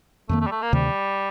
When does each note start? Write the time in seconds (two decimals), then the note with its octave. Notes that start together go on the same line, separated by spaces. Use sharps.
0.29 F2 D#3 A3 A#3
0.41 A3
0.47 G3
0.51 A3
0.62 A#3
0.73 D2 C3 D#3 G3